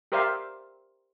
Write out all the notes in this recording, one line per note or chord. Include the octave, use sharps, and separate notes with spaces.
G4 A#4 C5 D5 E5 F5